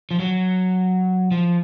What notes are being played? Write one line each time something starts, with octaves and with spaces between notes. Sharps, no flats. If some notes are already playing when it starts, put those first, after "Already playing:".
F3
F#3
F3